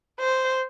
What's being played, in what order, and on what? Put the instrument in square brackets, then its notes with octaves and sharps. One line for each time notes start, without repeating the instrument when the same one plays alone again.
[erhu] C5